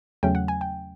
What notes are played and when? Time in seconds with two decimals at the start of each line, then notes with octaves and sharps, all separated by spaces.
0.23 E2 C#3 F#3 A3 C#4 G5
0.35 F#5
0.48 G#5
0.61 G5